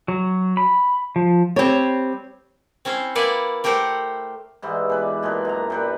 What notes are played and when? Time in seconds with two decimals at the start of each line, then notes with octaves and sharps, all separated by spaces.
0.08 F#3
0.57 B5
1.16 F3
1.56 G3 C4 C#5
2.85 C4 C#4 E4 C5
3.15 A#3 E4 B4 D5 F#5
3.64 A3 G4 A#4 C5 F#5
4.62 G#2 E3 G3 G#3
4.89 B2 B4 D5
5.23 A#2 G#3 D4 B4
5.45 F#2 A#5
5.70 F#2 G3 B4